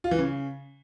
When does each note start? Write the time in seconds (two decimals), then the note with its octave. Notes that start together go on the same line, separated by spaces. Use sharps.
0.04 F4
0.11 E3
0.18 C#3